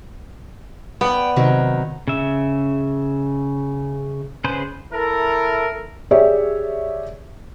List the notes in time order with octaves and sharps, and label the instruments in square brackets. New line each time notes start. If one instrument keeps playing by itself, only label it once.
[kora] B3 [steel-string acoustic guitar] D5 G5
[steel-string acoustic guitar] C3 D#3 F#3
[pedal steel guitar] C#3 E5
C#3 G#4 B4 C5
[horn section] E4 A4 A#4
[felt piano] G4 G#4 C#5 D5 E5